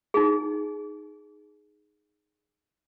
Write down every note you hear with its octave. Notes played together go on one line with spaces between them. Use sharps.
D#4 G#4